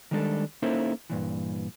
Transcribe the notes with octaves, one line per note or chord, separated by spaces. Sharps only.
D#3 G3 G#3 D4 F#4 A4
A#3 C#4 D#4 E4 A4 C5
G2 A#2 E3